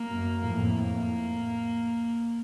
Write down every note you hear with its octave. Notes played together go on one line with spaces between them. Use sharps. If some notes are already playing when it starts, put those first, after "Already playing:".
Already playing: A#3
F#2
F2 A2 A#3
A#3